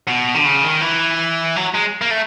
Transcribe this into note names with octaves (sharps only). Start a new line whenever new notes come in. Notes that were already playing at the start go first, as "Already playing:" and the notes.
B2
D3
C#3
D#3
E3
F#3
G#3
A#3
A3